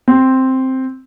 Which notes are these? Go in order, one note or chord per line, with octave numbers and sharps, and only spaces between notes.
C4